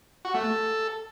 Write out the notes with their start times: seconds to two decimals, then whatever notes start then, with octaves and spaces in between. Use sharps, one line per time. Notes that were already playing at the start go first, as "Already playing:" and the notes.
0.25 F#4
0.34 A3
0.43 A4